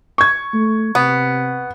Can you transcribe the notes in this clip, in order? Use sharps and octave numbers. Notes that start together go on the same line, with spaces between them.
C#6 G#6
A3
C3 B3